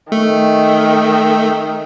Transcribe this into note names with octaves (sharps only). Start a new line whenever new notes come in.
D#3 A3